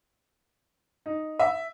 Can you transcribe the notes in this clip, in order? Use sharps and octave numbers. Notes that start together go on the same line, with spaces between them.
D#4
E5